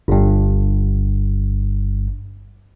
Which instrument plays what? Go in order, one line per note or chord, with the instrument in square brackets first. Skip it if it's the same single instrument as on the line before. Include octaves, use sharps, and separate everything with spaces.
[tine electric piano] G1 G2